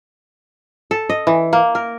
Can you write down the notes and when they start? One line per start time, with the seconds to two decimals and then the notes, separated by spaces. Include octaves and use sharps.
0.91 A4
1.10 D#5
1.27 E3
1.53 A#3
1.75 A#4